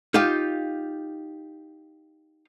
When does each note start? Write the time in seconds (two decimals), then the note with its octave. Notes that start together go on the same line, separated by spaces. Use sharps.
0.14 D#4 F4 G4 F5